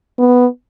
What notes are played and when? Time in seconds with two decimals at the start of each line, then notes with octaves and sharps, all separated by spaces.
0.18 B3